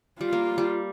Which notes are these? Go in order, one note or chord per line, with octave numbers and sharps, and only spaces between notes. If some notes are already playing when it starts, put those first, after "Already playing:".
G3 F4
A#3
G3